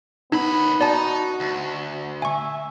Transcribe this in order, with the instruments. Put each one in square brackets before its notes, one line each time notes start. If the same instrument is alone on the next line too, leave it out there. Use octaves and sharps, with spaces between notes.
[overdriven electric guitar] D#2 B5 [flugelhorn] B3 [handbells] D#4
[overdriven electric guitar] D#4 [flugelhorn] F#4 [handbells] D5 A5
[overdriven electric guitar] D2
[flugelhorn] E5 [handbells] G#5 C#6